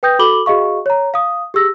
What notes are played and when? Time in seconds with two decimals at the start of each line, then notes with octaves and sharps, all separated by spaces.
0.03 B4 G5 D#6 G6 A#6
0.19 F#4 A4 B5 D6 F#7 G7
0.46 F#4 G#4 D#5 F5 C#6
0.86 C#5 A#5
1.14 F5 D#6
1.54 G4 G#4 E6 A#6